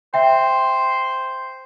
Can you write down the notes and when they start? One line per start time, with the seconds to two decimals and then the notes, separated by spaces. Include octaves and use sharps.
0.14 C5 E5 G5